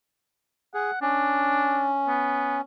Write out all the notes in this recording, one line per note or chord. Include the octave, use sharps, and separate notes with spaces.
G#4 F#5
C#4 D4
B3